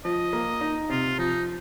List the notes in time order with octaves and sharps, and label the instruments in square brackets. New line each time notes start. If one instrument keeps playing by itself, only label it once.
[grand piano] F3 [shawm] D#5
[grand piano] A#3
D#4
[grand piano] C3 [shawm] F4
[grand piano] F3 [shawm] D#4